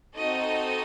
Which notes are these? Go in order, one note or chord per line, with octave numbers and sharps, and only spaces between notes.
C4 D#4 F#4 A4 D#5